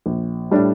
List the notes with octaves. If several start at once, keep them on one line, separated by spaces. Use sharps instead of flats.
A#1
A2 G3 D4